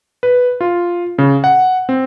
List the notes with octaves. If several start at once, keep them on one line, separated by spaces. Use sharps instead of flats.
B4
F4
C#3
F#5
C4